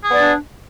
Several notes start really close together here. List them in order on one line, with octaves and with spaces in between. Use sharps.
G#4 B3 D5 D4